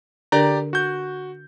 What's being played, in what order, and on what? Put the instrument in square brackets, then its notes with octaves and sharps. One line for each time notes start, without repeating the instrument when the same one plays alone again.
[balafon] D3 D4 A#4 [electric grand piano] G4 D5 A#5
[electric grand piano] F#4 G6